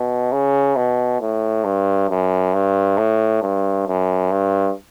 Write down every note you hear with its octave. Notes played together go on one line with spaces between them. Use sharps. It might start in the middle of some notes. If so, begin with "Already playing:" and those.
Already playing: B2
C#3
B2
A2
G2
F#2
G2
A2
G2
F#2
G2